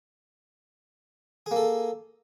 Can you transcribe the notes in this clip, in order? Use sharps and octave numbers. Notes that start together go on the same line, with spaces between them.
A#3 G#4 A4